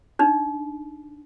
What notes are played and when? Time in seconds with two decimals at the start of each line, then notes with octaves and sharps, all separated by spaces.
0.19 D4 D#4